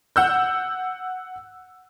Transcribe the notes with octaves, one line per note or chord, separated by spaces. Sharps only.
F#5 E6 G6